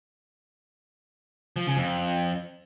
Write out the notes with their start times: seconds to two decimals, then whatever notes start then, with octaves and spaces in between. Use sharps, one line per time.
1.56 F3
1.67 C#3
1.77 F2